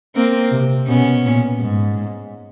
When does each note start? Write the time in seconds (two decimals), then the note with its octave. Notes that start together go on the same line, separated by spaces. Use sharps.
0.15 A#3 C4
0.51 C3
0.88 B2 B3 C#4
1.24 A#2
1.61 G#2